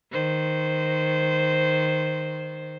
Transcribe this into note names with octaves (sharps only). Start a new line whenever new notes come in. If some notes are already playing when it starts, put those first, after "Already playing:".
D#3 C5